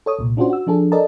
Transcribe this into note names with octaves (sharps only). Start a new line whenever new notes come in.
A4 C#5 D#6
C2 A#2
C#4 D4 F4 F#4 C5
F#4 E6
F3 D4 G#4 A4
A4 A#4 D5 D#5 A5